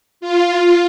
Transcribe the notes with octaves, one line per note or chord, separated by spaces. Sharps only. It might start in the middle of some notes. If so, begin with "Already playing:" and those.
F4